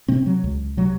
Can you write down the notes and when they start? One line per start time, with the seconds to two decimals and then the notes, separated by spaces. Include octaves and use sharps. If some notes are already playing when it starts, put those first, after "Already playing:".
0.08 C3 C4
0.26 F#3
0.44 C#2
0.77 C3 F#3